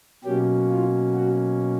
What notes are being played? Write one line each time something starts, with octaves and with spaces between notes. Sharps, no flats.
B2 F#3 A#3 C#4 G4
F4
F#4